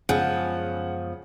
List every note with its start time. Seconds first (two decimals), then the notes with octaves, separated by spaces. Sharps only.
0.09 F#2 C#3 F3 G#3 B3 G#4 F#5 G#5